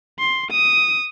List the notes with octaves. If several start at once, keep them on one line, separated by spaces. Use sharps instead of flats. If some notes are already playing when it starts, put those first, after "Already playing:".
C6
D#6